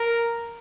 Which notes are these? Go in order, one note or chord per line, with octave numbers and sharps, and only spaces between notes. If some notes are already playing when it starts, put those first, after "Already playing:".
Already playing: A#4